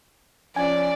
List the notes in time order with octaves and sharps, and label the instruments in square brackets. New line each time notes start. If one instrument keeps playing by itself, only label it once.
[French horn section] F3 C#4 [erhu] D5 [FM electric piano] G#5